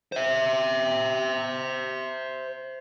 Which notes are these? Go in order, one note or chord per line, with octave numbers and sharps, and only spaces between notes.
C5 E5